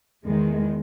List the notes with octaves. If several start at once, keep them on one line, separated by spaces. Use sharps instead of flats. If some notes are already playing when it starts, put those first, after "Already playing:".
E2 D#3 G#3